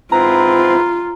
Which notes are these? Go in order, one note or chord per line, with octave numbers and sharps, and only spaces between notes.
G#2 C4 E4 F4 B4 A#5